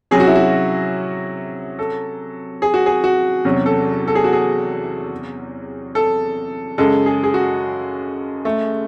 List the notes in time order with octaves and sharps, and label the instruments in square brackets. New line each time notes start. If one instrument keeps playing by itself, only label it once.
[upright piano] C3 F#3 C#4 [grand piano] G#4
[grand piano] F#4
E4
F#4
A4
G#4
F#4
G#4
F#4
[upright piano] E2 C3 F#3 C#4
[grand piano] A4
A4
G#4
F#4
G#4
A4
[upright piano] F#2 C#3 G#3 [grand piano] A4
[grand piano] G#4
G#4
F#4
A3